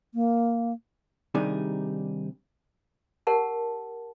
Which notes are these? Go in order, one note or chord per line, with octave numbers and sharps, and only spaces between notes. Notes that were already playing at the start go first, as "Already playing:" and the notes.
A#3
C3 D#3 G3 D4 D#4 G#4
G4 A#4 F#5 A5